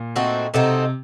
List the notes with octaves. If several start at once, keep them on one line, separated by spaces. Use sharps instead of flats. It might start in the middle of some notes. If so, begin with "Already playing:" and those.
Already playing: A#2
A3 C4 D#4 F#4
C3 A3 C4 D#4 F#4